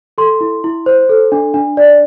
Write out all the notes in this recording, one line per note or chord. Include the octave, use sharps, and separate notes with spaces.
A4 C6
E4
E4
C5
A4
D4
D4
D5